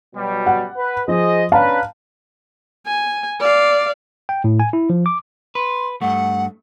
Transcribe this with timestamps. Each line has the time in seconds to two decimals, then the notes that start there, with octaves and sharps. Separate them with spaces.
0.15 B2 F#3 G3
0.46 F#5
0.77 B4
1.08 F3 G#4 C5 D#5
1.52 C#4 D4 B4 F5 A5 A#5
2.86 G#5
3.41 D5 F5
4.29 G5
4.44 A2
4.60 G#5
4.73 E4
4.90 F3
5.06 D6
5.55 B4 C6
6.02 G2 A3 F#5